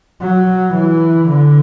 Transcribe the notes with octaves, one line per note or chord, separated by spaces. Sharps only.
F#3
E3
D3